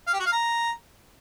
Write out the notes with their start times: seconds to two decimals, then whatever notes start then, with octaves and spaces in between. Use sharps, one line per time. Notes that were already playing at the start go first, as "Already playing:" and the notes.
0.07 F5
0.13 G4
0.20 F#4
0.26 F5
0.32 A#5